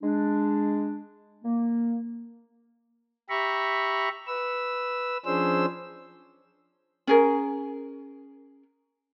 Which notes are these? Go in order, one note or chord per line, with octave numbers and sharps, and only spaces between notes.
G#3 D4
A#3
G4 E5 A#5 B5 C#6
B4 E6
F3 C#4 D4 G#4 C5 E6
C#4 G#4 A#4